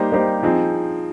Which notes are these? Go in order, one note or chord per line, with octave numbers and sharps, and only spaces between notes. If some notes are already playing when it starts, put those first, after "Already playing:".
Already playing: G3 A#3 D#4 G4 C5
G3 A#3 D#4 G4 C5
F3 C4 D#4 G#4